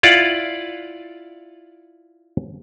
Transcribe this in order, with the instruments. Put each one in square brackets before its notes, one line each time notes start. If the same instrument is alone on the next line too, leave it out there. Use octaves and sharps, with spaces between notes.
[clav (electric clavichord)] E4 F4 D5 F#5